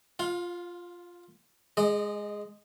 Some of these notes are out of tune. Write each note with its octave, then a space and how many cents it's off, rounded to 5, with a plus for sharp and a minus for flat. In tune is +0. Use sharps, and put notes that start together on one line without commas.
F4 +0 F5 +30
G#3 +0 D#5 -35